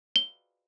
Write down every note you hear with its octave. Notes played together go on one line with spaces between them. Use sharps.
G7